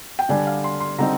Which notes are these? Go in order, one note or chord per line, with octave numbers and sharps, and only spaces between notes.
G5
D3 G3 D4 G#5
F5
C6
C6
D3 G3 C4 D#4 A#5